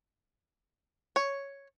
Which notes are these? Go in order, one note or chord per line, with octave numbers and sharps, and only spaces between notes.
C#5